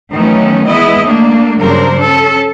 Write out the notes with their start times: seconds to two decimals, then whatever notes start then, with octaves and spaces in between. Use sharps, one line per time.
0.13 D#3 E3 F#3 A3 B3 C#4
0.66 G#3 B3 E4 D#5
1.06 A3 A#3 D4
1.60 G2 C#3 F#3 D4 A#4 C5
2.02 C#4 A4